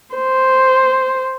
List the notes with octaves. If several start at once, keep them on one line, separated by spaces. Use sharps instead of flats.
C5